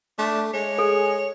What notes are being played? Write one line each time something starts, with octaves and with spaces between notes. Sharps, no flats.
A3 D4
G#3 C#5
G#4 A4